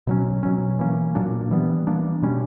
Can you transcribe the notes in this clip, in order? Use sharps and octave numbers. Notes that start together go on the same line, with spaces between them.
B2 F#3 C#4
B2 F#3 C#4
E3 A#3 C#4
A#2 F#3 A#3 D4
E3 G3 B3
E3 A#3 D4
B2 G3 C#4